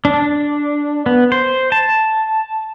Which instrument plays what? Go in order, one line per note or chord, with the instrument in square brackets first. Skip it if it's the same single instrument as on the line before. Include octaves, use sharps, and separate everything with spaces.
[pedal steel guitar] D4
B3
C5
A5